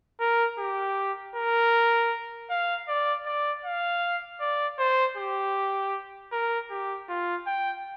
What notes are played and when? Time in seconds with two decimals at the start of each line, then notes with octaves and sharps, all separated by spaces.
0.20 A#4
0.59 G4
1.36 A#4
2.50 F5
2.88 D5
3.26 D5
3.65 F5
4.41 D5
4.79 C5
5.17 G4
6.32 A#4
6.71 G4
7.09 F4
7.47 G5